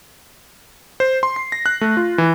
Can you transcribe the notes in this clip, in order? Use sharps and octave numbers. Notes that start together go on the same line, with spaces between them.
C5
C6
C7
A#6
F#6
A3
F4
E3